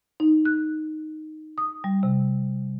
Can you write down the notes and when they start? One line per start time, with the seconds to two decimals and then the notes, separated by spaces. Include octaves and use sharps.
0.20 D#4
0.45 F#6
1.58 D#6
1.84 G3
2.03 C3